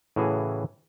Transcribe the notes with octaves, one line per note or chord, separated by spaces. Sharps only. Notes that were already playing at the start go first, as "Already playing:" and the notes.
A2 C#3 E3 F#4 G#4